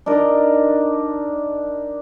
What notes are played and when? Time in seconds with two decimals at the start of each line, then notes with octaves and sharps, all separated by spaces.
0.06 D4 D#4 A#4 D#5